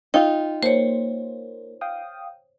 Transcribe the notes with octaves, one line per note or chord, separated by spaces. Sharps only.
D#4 F4 G5
A#3 C5 C#5
F5 G5 D#6